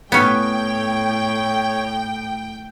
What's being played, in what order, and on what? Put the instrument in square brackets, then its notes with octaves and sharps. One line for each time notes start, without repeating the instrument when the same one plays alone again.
[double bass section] A2 [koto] B3 C#4 [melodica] C#5 [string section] G5